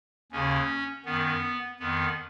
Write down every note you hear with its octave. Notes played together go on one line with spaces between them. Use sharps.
D#2 C#3 C#4
F#2 D#3 B3
F2 D#3 B3